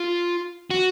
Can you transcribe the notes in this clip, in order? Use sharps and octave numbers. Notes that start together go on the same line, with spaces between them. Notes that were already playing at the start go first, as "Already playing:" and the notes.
Already playing: F4
F#4